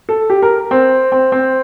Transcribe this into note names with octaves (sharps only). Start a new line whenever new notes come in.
A4
G4
A#4
C4
C4
C4